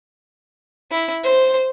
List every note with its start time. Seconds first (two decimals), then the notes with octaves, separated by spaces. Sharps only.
0.91 E4
1.24 C5